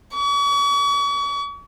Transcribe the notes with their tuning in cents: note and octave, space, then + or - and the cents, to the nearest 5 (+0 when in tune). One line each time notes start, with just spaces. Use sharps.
C#6 +40